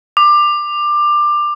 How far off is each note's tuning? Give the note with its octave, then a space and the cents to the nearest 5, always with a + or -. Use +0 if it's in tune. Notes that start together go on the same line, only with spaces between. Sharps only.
D6 +20